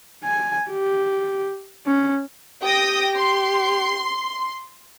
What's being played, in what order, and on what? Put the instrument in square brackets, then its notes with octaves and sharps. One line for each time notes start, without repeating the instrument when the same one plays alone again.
[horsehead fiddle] G#5
G4
C#4
[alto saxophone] G4 [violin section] G5 D#6 A#6
[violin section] C6